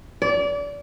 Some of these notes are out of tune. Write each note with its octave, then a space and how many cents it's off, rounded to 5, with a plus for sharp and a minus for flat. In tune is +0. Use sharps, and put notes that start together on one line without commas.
D5 -30